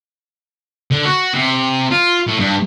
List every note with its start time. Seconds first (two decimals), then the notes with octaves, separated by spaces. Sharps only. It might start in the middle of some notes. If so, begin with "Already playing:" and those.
0.91 D3
1.05 F#4
1.34 C3
1.91 F4
2.27 A2
2.39 G2